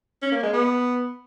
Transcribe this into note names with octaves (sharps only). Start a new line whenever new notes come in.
C#4
A#3
G#3
B3